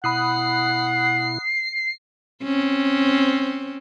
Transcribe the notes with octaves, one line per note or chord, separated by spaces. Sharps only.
B2 E4 F#5 B5 D#6 F#6 C7
C4 C#4